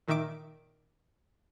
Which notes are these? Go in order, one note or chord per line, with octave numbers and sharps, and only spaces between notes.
A#2 D#3 D#4 E5 D6 D7